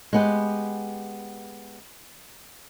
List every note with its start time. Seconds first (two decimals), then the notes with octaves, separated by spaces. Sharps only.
0.13 G#3 B3 G4